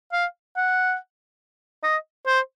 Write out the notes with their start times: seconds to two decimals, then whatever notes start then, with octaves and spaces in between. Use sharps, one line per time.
0.12 F5
0.56 F#5
1.83 D#5
2.27 C5